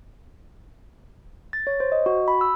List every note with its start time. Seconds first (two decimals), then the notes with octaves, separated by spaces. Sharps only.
1.53 A6
1.67 C#5
1.80 C5
1.92 D#5
2.06 F#4
2.28 B5
2.41 E6